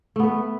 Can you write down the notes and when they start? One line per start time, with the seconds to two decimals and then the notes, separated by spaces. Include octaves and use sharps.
0.16 A3
0.20 B3
0.23 B4